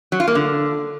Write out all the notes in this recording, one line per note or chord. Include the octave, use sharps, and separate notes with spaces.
F#3
F4
A#3
D3